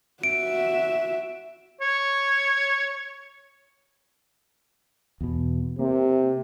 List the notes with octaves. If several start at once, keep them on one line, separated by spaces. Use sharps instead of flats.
F#4 E5 D7
C#5
E2 B2
C3 A#3